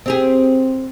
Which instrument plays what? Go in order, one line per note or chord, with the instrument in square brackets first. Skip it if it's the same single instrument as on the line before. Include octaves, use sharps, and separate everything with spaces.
[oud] C4 G4 G#4